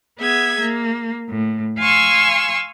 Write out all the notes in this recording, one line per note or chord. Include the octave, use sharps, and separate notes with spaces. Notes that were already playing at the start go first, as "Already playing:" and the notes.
B3 G#4 E5 G#6
A#3
A2
F5 G#5 C6 C#6 E6